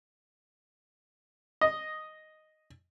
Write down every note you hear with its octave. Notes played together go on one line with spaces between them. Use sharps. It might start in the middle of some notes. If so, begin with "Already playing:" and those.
D#5